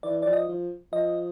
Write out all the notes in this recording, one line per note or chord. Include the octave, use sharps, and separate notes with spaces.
E3 D5
F3 D5
D#5
F3
F3 D#5